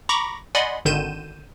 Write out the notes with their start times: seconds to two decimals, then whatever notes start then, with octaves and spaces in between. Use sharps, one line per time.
0.09 A#5 B5 C#6 D6 A#6
0.55 D5 D#5 F#5 G#5 B5 C6
0.85 G#1 D3 D#3 G6 D#7 E7